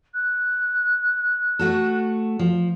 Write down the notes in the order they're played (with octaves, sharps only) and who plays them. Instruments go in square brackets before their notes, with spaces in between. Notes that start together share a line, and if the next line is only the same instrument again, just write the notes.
[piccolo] F#6
[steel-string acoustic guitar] A3 F#4 A4
F3